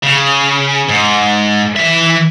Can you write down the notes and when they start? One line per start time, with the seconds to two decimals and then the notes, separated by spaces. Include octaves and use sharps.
0.03 C#3
0.89 G#2
1.76 E3 E5